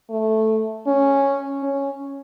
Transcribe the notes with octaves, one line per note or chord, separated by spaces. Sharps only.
A3
C#4
C#4